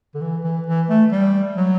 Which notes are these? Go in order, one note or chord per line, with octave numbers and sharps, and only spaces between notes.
D3
E3
E3
E3
A3
G3
F#3